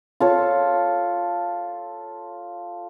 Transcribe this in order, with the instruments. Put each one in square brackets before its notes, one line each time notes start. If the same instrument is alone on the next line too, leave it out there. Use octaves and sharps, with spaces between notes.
[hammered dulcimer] F4 A4 C#5